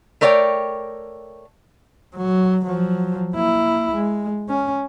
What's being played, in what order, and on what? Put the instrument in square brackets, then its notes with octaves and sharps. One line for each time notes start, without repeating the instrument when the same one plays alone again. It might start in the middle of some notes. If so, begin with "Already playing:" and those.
[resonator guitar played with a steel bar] A3 A#4 C#5 D5 F#5 G5
[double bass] F#3
F3 F#3
A#3 E4
G#3
C#4